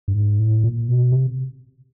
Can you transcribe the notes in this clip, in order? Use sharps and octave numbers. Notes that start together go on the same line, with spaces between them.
G2
G#2
A2
A#2
B2
C3